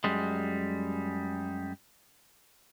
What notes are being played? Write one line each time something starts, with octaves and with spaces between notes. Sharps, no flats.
F#2 G3 G#3